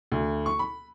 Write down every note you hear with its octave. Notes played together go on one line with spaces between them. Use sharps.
D2
C#6
B5